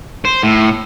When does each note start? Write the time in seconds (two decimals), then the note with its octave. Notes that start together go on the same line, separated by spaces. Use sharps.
0.25 C5
0.43 A2